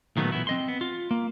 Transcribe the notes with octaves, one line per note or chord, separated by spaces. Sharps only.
A#2 D#3 F#3 A3 B3
B1 E3 B3 E4
C4 D#5 C6
B3
F4
A#3